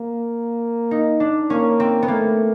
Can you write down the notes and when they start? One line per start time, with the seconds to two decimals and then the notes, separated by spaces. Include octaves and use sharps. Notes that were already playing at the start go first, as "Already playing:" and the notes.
Already playing: A#3
0.91 D#4
1.20 D4
1.50 A#3 C#4
1.80 C4
2.02 B3
2.08 A3 A#3